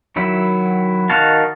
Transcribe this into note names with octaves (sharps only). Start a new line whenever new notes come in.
D#3 F#3 E4
D#3 D#4 F#4 F5 A5